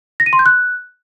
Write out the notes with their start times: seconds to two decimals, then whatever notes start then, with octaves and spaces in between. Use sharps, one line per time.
0.20 A#6
0.26 D#7
0.33 C6
0.39 G6
0.46 F#6